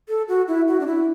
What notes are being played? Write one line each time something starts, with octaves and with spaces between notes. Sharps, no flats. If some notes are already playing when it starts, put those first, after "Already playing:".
A4
F#4
E4
F#4
D4
E4